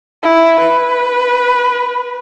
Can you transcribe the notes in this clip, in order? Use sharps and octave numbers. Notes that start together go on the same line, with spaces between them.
E4
B4